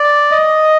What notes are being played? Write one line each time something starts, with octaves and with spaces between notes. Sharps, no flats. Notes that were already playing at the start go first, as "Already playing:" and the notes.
Already playing: D5
D#5